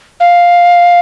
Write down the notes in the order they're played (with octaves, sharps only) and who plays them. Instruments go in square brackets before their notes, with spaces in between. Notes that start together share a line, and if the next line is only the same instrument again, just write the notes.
[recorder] F5